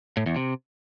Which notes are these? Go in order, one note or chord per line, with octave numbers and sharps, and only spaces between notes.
A2
E2
C3